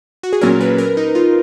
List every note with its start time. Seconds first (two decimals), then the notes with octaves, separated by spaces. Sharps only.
0.23 F#4
0.33 G#4
0.41 A#2 F#3 C#4 A#4
0.60 B4
0.78 A#4
0.97 D#4
1.15 F4